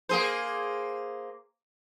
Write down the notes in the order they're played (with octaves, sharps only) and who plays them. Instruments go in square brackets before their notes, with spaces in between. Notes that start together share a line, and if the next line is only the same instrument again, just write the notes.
[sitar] A#3 G#4 C5